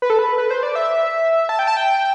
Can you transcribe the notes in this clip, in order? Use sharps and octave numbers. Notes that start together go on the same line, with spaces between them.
B4
A4
B4
B4
C5
D5
E5
A5
G5
A5
G5